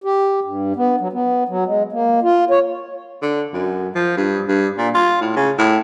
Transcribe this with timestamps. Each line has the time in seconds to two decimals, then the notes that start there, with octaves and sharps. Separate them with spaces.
0.04 G4
0.44 G2
0.76 B3
1.00 F#3
1.13 B3
1.48 F#3
1.67 G#3
1.92 A#3
2.23 F4
2.51 C#5
3.22 D3
3.53 F#2
3.95 F3
4.17 G2
4.48 G2
4.78 A#2
4.95 F4
5.21 A2
5.36 C#3
5.58 A2